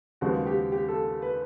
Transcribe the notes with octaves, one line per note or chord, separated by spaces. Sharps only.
D#2 C#3 F3 G#3 B3 F#4
G4
G4
A4
B4